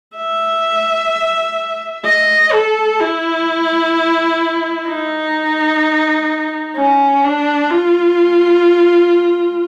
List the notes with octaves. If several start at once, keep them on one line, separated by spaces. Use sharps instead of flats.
E5
D#5
A4
E4
D#4
C#4
D4
F4